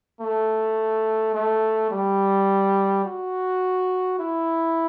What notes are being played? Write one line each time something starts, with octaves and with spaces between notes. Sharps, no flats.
A3
A3
G3
F#4
E4